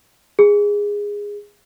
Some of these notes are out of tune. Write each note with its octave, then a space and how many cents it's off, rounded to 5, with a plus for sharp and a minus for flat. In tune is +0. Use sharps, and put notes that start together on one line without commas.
G#4 -15